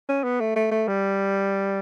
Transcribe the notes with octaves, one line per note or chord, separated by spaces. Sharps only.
C#4
B3
A3
A3
A3
G3